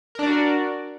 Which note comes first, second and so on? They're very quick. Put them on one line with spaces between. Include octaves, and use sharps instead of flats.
A#4 D4 D5 F#4